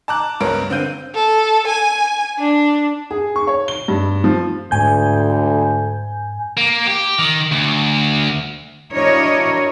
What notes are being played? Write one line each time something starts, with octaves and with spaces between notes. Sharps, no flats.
A5 A#5 D6 F#6
C#2 G2 B3 A#4 C#5 D7
D3 C4 F5 G6 D#7
A4
G#5
D4
G#4
C#6
C#5
G7
G2
F3
D2 G#2 G#5 G6
A#3
G4
D#3
D2
D4 E4 F#4 A#4 C#5 D#5